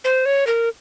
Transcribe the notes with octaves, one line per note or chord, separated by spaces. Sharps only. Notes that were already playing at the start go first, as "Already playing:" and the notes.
C5
C#5
A#4